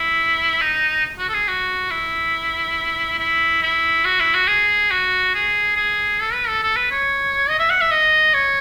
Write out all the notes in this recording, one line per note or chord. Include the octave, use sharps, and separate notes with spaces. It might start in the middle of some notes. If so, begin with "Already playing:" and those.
Already playing: E4
D#4
F#4
A4
G#4
F#4
E4
E4
E4
F#4
E4
F#4
G#4
F#4
G#4
G#4
A4
B4
A4
A4
B4
C#5
D#5
E5
F#5
E5
D#5
C#5